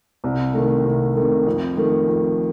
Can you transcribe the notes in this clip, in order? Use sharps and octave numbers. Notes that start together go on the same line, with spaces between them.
C2
C3 D#3 A3
C2
C3 D#3 A3
F2
D#3 A3
F2